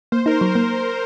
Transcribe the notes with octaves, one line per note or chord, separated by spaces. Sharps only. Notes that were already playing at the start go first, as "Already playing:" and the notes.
A#3 C5
D#4 A#4
C5
F#3
A#3 C5